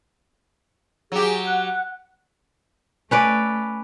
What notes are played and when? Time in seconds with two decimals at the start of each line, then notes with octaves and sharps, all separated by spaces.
1.12 F#3 G4 G#4
1.46 F#5 F#6
3.11 A3 C#4 B4 D5